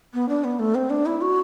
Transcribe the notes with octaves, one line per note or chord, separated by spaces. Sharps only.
B3
D4
B3
A3
C4
D4
E4
F#4